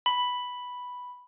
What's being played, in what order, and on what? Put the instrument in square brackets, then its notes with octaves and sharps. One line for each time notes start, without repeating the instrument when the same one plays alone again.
[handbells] B5